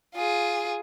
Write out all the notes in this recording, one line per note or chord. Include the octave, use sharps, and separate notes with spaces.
F4 G#4